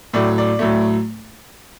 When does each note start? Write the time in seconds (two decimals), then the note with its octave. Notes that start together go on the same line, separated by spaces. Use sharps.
0.14 A2 F#3 A3 D5
0.38 D5
0.59 A2 F#3 A3